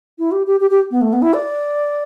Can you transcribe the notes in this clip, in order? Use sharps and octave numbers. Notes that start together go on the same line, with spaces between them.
E4
G4
G4
G4
G4
B3
A3
B3
E4
D5